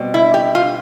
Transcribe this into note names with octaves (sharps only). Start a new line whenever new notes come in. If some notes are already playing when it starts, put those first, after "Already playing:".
Already playing: B2 G3 C4
E4
G4
F4